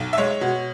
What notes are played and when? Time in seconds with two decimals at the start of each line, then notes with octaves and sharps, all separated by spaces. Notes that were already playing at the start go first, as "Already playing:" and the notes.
Already playing: B1
0.13 E5
0.18 G#3 C#5
0.41 B2